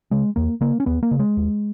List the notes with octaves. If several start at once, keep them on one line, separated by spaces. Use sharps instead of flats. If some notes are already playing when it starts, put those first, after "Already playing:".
C#3 G#3
E2 A#3
C#3 A#3
C#4
D#2 B3
A#3
C#3
G#3
D#2